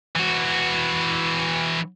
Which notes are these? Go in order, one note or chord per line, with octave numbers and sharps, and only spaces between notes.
E3 F#4